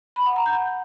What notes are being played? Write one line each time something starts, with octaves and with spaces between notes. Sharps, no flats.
B5
F#5
A#5
G6